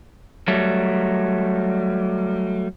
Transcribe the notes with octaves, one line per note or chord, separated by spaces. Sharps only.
F#3 G3 A3